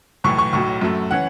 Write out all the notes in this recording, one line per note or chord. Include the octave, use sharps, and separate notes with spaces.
B1 A2 E3 A3 C#6
C#6
B1 A2 F#3 C#6
F#2 F#3 A3
E3 C#4 F#5